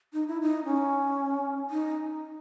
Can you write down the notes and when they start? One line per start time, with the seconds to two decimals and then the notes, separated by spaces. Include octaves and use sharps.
0.13 D#4
0.28 E4
0.41 D#4
0.65 C#4
1.70 D#4